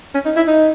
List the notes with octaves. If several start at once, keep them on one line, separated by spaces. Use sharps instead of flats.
C#4
D#4
E4
D#4